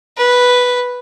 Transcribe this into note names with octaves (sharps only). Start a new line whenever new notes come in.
B4